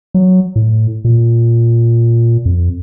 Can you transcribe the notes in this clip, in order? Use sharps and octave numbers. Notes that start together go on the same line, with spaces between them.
F#3
A2
A#2
F2